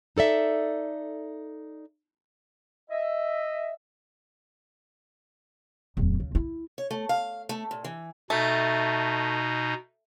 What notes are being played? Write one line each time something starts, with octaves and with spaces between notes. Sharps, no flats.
D#4 A4 D5 E5
D#5 E5
D1 E2
C#3
E4
C#5
A3
F5
A3
A#2
E3
B2 A3 D#4